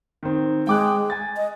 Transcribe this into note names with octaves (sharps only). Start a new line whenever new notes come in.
D#3 C4
G#3 G5 D6 F#6
G#5 A6
D#5